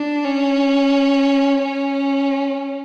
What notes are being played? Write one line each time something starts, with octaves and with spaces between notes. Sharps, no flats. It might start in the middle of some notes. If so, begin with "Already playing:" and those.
Already playing: D4
C#4
C#4